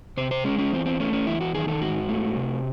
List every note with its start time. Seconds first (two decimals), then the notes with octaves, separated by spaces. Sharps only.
0.17 C3 C5
0.31 C5
0.44 G#3 C#4
0.58 C#4
0.72 E2 C4
0.86 C4
1.00 A3 C#4
1.13 C#4
1.27 E2 E4
1.41 F#4
1.54 D#3 G#4
1.68 A4
1.81 G#2 F#4
2.09 A3
2.37 C3